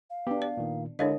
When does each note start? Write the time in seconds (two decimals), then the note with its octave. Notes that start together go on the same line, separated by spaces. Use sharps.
0.10 F5
0.27 B3 D4 G4
0.42 D5
0.57 A#2 D#3
0.99 D3 G#3 D4 E4 A#4 C#5 D#5 F5